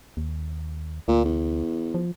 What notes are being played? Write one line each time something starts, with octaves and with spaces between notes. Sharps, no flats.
D#2
D2 A#2
E2
F3